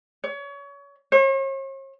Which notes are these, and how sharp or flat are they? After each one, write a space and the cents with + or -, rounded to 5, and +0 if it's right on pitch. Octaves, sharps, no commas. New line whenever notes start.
C#5 +30
C#5 -45